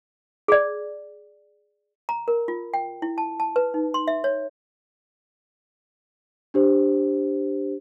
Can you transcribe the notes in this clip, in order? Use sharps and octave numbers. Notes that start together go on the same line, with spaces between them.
G#4 D5
A#5
A#4
F4
G5
E4
A5
A5
B4
D#4
C6
E5
C#5
D4 G4 C5